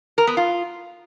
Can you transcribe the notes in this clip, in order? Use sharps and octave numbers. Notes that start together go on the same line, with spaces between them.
A#4
B3
F4